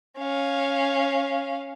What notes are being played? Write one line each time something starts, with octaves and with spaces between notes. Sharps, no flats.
C#4 F5